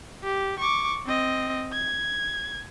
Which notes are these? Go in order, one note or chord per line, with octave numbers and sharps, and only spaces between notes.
G4
C#6 D6
C4 D#5
G#6